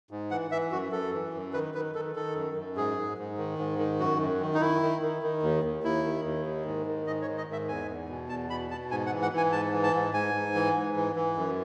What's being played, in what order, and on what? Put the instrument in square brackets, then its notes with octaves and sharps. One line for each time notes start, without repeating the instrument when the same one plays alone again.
[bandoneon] G#2
E3 F#5
E3 E5
F#2 F#4
F#2 A4
E3
F#2
D#3 B4
D#3 B4
D#3 A4
D#3 A4
F#2
F#2
G#2 G#4
G#2
G#2
D#3
G#2
D#3
F#2 F#4
F#2
D#3
D#4
D#3 E4
D#3
D#3
D#3
D#2
D#2
D#2 E4
D#3
D#2
D#3
G#2
D#3
G#2 D#5
C#5
D#3
D#5
G#2 E5
E2 G#5
E2
B2
E2 A5
B2 B5
B2 A5
G#2 G#5
F#5
E3
F#5
E3 G#5
G#2 A5
E3
A5
G#2
G#2 G#5
G#2
E3
G#2
E3
E3
F#2